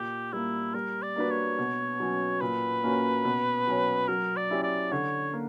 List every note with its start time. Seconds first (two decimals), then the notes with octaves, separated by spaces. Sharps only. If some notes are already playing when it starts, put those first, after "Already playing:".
Already playing: A#2 G4
0.33 G3 A#3 E4
0.74 G3 A#4
1.02 D5
1.16 A#3 D4 F#4 B4
1.31 C#5
1.58 B2
2.00 F#3 C#4 F#4
2.41 A#2 B4
2.84 A#3 C#4 F#4 C#5
3.25 B2
3.67 F#3 C#4 F#4 C#5
4.08 F#3 A#4
4.37 D5
4.50 C#4 E4 G4
4.63 D5
4.92 D3 C#5
5.33 A#3